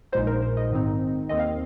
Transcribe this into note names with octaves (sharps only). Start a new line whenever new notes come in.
A#1 A#2 G#3 D#4 C5
A#4
C5
D#5
G#2 D#3 C4 D#4
D#2 D#3 C4 D#5
F5